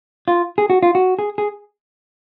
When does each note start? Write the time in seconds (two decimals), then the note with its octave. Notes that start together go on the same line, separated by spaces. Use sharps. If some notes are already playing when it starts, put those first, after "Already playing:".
0.28 F4
0.58 G#4
0.70 F#4
0.83 F4
0.95 F#4
1.19 G#4
1.38 G#4